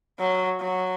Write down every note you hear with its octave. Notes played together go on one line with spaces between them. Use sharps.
F#3
F#3